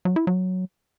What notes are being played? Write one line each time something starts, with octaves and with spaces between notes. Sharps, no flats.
F#3
E4
F#3